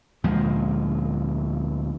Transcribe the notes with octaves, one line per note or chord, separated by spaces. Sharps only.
D2 A#2 F3 G#3